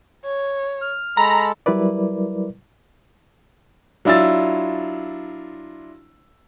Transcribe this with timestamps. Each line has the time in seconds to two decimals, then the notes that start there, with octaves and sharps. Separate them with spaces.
0.25 C#5
0.81 F6
1.17 G#3 A4 A#5 B5
1.66 F#3 G3 E4 A#4 B4 D5
4.05 F#3 D4 E4 F4 E6 A6